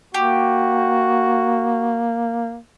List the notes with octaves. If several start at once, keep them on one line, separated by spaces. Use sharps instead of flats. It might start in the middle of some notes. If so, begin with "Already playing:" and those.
A#3 F#4 G4